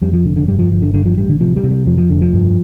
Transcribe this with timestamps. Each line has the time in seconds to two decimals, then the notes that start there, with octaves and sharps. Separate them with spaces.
0.02 F2 G3
0.13 F3
0.25 F1 D3
0.36 D3
0.48 G2 G3
0.59 F3
0.71 G1 F3
0.82 D3
0.94 G2 D3
1.05 F3
1.17 A1 G3
1.29 D3
1.40 C3 F3
1.56 G3
1.64 C3
1.71 G3
1.86 F2 F3
1.98 F3
2.10 F1 D3
2.21 F3
2.33 G2